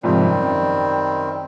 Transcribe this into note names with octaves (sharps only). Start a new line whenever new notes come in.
F2 G#2 C3 D#3 G3 C4
F#2